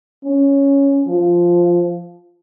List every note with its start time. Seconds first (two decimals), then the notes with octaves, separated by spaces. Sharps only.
0.24 C#4
1.07 F3